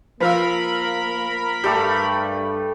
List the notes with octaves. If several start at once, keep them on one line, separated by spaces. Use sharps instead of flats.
F3 A#3 A#4 F5 B5 E6
G2 G3 A3 G4